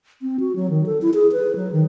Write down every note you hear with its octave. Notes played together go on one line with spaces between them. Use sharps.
C4
F#4
F#3
D#3
A4
E4
G#4
B4
F#3
D#3